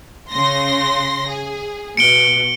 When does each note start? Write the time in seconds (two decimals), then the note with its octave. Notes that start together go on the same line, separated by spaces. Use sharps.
0.32 C#3 C6 A#6
1.29 G#4
1.97 B2 C#7 D7 G7